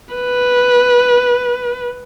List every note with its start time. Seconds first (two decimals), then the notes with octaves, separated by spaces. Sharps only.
0.15 B4